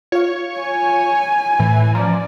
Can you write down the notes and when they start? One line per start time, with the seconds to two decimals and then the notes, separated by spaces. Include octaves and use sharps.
0.12 F4 C#5 F5
0.60 G#5
1.60 A2 E3
1.95 F3 C#4 D5 A#5